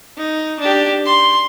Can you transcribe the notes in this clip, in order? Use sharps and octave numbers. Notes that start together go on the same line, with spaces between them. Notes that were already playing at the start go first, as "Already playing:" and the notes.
D#4
D4 G4
C6